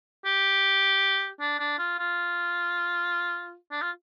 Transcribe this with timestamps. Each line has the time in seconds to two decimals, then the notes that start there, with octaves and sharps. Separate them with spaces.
0.26 G4
1.41 D4
1.59 D4
1.78 F4
1.99 F4
3.71 D4
3.82 F4